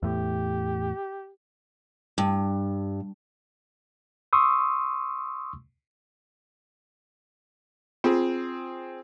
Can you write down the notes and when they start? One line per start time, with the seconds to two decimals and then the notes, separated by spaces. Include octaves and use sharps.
0.03 E2 A2 G4
2.18 G2
4.33 C6 C#6 D#6 E6
8.04 C4 F4 G#4